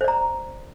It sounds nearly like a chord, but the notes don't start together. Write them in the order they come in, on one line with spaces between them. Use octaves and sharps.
C5 D5 A#5